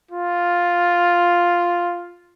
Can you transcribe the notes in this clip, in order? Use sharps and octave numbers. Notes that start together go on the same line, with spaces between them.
F4